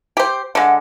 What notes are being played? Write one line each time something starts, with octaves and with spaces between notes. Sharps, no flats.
G4 C5
D3 G#3 F#5